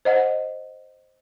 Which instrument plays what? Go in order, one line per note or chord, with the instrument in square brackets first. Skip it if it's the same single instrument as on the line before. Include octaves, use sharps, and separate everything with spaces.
[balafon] C5 D#5 F#5